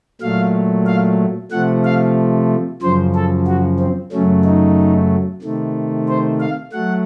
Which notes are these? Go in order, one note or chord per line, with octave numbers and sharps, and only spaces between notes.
A#2 F#3 A3 F5
F5
C3 F3 A3 F#5
F5
F#2 C#3 F3 C5
A4
F#4
C4
F#2 C#3 F#3 A3 C#4
D#4
C3 D#3 A3
C5
F5
F#3 A3 F#5